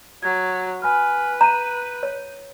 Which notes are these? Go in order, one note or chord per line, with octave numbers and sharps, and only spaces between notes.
F#3 G#6
B4 G#5 B5 F6
A#5 G6 D#7
C#5